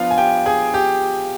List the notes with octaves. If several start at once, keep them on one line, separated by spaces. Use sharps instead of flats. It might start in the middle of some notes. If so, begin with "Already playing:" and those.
Already playing: F3 B3 D4 F4 F5
G#5
G4 G5
G#4 G#5
G4 G5